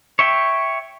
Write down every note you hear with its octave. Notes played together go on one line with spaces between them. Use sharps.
C#5 E5 G5